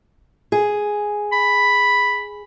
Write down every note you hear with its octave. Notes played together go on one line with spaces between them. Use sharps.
G#4
B5